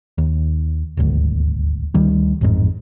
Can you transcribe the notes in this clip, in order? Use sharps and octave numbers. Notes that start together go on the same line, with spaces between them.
D#2
D#1 G#1 D2
D2 D#3 G3
A1 F2 G#2